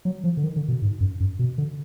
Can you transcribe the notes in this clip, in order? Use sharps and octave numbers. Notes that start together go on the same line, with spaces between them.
F#3
F3
D3
D#3
D3
B2
G#2
F#2
F#2
B2
D3